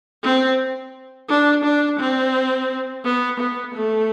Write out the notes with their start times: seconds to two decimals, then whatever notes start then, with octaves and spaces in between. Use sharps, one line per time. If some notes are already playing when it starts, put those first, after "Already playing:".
0.24 C4
1.29 D4
1.64 D4
1.99 C4
3.05 B3
3.40 B3
3.75 A3